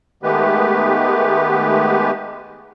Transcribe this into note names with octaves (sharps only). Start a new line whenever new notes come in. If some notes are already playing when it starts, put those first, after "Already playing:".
D#3 G#3 A3 B3 G4 B4